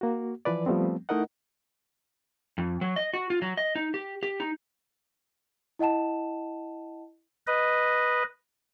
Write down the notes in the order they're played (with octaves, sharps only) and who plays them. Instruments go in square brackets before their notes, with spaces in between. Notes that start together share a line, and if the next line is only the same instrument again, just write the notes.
[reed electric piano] A#3 F#4
E3 F3 B4 D5
F3 G3 A3 B3 C4
A3 D#4 E4 A#4 D#5 F#5
[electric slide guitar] F2
F#3
D#5
F#4
F4
F#3
D#5
D#4
G4
G4
D#4
[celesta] E4 D#5 F#5 A5 E7
[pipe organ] B4 D#5